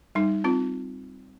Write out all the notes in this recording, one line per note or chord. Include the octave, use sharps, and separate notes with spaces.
G3 D#4
C4 F4